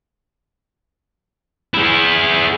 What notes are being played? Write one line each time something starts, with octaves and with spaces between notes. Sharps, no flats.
E4 G#4